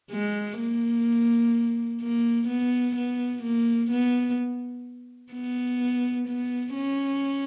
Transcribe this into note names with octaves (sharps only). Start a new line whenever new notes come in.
G#3
A#3
A#3
B3
B3
A#3
B3
B3
B3
C#4